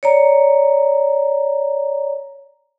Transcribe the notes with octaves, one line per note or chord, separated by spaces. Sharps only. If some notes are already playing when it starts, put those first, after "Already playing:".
C#5 D5 A#5